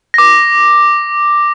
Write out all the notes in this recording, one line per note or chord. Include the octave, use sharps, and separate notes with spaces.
D6 A#6